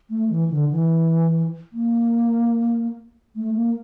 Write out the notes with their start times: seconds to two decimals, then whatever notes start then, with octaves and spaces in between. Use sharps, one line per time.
0.10 A3
0.30 E3
0.50 D3
0.71 E3
1.73 A#3
3.36 A3
3.56 A#3